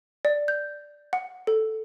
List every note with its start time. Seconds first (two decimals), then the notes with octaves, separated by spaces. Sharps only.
0.25 D5
0.48 G6
1.13 F#5
1.47 A4